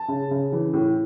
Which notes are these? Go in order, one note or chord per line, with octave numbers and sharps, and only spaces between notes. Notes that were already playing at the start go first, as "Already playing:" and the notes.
Already playing: A5
C#3
C#3
E3
A2